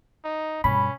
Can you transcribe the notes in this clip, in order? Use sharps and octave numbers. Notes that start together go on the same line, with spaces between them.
D#4
G2 B2 C#4 B5